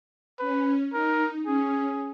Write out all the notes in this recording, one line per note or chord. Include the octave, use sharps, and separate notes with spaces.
C#4 B4
D#4 A#4
C#4 G#4